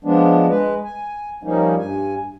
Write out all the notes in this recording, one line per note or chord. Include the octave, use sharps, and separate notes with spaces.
F3 G#3 B3 D4
G#3 B4
G#5
F3 G3 A#3 C#4 D#4
G2 G#5